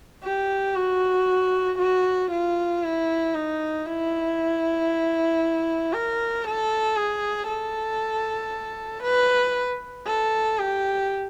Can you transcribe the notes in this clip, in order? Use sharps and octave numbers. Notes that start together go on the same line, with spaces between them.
G4
F#4
F#4
F4
E4
D#4
E4
A#4
A4
G#4
A4
B4
A4
G4